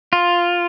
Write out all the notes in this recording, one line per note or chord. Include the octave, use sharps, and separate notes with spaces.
F4